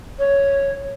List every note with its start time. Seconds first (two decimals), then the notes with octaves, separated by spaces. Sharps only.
0.19 C#5